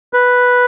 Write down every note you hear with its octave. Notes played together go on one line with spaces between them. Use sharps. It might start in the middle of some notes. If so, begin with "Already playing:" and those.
B4